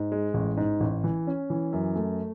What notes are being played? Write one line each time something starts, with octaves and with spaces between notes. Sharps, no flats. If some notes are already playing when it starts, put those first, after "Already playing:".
Already playing: G#2
G#3
A1
G#2
A1
E3
C#4
E3
F#2
A3